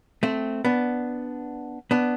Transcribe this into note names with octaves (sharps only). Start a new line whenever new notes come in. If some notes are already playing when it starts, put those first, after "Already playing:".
A3 C4
B3 D4
B3 D4